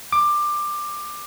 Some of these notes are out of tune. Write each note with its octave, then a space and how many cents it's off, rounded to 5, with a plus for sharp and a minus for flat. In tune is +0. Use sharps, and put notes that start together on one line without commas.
D6 +20